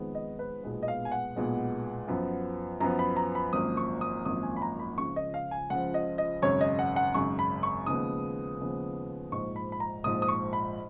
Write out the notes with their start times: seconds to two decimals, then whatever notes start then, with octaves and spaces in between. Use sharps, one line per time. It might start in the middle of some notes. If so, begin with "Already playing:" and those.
Already playing: F2 D#3 G#3 B3
0.15 D#5
0.39 B4
0.64 B1 A#2 G#3 B3
0.83 D#5
0.88 F5
1.05 G#5
1.12 F#5
1.36 B1 A#2 G#3 B3
2.08 F#2 F3 B3
2.80 F#2 F3 B3 A#5
2.99 B5
3.16 A#5
3.35 B5
3.53 G#1 F#2 F3 A#3 D#6
3.77 C#6
4.01 D#6
4.25 G#1 F#2 F3 A#3 D#6
4.43 G#5
4.56 B5
4.62 A#5
4.79 B5
4.98 C#2 C#3 F3 C#6
5.16 D#5
5.34 F5
5.51 G#5
5.70 C#2 C#3 F3 F#5
5.94 D#5
6.18 D#5
6.42 G#1 F#2 C#3 C#5
6.61 D#5
6.79 F#5
6.96 F#5
7.14 G#1 F#2 C#3 C#6
7.39 B5
7.63 C#6
7.86 D#2 C#3 F3 G#3 B3 D#6
8.59 D#2 C#3 F3 G#3 B3
9.31 A#1 G#2 F3 C#6
9.56 B5
9.72 B5
9.80 A#5
10.04 A#1 G#2 F3 D#6
10.22 D#6
10.28 C#6
10.53 B5